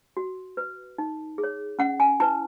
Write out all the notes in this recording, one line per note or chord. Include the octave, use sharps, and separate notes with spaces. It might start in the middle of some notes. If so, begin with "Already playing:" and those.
F#4
B4
D#4
G#4
C#5
C#4 F#5
G#5
E4 B4 A5